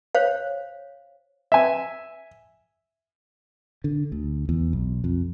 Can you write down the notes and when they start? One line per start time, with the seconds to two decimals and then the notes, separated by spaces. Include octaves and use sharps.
0.15 C5 C#5 F5
1.52 E5 G#5
3.84 D3
4.12 D2
4.49 E2
4.73 B1
5.04 F2